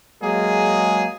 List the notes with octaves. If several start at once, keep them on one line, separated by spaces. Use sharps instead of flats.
F#3 G#3 A#3 G#4